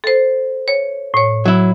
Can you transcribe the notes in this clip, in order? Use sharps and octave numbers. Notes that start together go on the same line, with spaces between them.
A4 C5
C#5
A2 C#5
F#3 E4